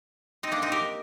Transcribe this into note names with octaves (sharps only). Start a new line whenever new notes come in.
C4 D#4
A#3 D4
C4 D#4
G4 A#4